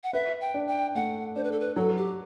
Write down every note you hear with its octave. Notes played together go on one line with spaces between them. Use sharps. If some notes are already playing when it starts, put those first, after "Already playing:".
F#5
B4 E5
G5
D4
G5
A3 F#5
D4 C5
B4
A4
B4
F#3 A4
G4